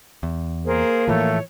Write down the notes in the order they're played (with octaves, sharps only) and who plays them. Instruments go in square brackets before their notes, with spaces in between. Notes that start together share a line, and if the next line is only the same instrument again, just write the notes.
[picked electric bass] E2
[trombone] A#3 [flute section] G#4 A#4 C5
[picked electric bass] A2 E3 F3 [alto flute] A3 [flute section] C#5